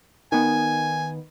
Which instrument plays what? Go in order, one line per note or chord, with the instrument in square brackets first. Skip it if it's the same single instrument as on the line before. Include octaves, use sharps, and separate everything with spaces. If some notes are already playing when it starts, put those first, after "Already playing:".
[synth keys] D#3 B3 [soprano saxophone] G#5